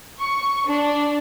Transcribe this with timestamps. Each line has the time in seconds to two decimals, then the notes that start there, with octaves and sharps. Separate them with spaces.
0.20 C#6
0.67 D4